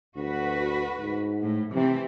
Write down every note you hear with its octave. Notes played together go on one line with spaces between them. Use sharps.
D2 F#4 B4
G#2
A2
C3 E3 C4